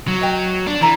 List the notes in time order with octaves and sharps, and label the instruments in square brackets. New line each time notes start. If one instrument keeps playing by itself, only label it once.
[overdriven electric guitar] F#3
[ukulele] D#5 G5
[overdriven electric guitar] D4
[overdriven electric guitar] E3 [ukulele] D4 A4 A#5